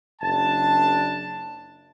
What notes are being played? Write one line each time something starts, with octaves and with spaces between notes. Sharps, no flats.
F#1 D4 A5